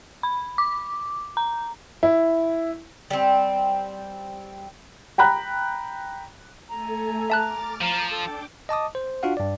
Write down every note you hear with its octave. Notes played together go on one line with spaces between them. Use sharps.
B5
D6
A#5
E4
G3 C4
G5 A#5 B5 F#6
A3 A4 G#5 A#5
E5 A5 D6 F6 F#6 A6
F3 A#5
D4 A4 G5 D6
D#5 A5 D6 D#6
C5
D4 F4 F#4 F5 F#5
G2 D5